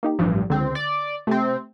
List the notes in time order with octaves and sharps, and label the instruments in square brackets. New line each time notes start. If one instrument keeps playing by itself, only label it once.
[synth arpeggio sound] A#3 D#4 G4
[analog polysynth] A1 G2 [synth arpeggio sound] F3
[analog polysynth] C#2 C4 [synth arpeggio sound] D3
[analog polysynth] D5
[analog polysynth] C3 C4 [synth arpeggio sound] A3